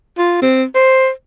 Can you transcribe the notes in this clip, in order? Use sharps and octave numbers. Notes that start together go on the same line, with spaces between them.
F4
C4
C5